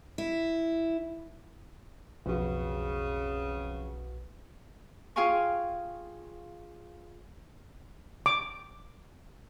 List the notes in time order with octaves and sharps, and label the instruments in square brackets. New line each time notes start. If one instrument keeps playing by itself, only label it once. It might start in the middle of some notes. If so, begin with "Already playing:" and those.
[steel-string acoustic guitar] E4
[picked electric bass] B1 [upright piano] F2 [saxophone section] C#3 [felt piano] F#4 B4
[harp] F4 G#4 F5 G5 G#5 C#6
[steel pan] D6